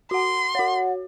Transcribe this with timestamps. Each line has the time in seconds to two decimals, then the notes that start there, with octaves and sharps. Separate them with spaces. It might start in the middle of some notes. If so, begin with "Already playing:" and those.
0.11 F#4 F#5 C6
0.55 F#4 C#5 F#5